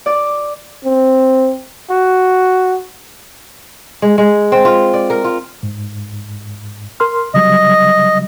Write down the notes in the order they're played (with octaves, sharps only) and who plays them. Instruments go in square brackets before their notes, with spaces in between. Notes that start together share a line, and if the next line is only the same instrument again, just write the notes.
[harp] D5
[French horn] C4
[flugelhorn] F#4
[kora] G#3
G#3
C4
F4
D5
A#4
F4
[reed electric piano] G#2
A#4 C6 F6
[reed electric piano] C#3 F#3 G3 [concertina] D#5